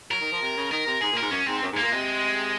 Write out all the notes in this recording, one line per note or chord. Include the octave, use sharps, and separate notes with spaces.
F#3 A#4
D#3
F3
C3
C#3
D#3 A#4
C3
G#2 G#4
A#2
G#2 A#4
F#2 C#4
G#2 C4
F#2
G#2
A#3
A#2
C3 G#3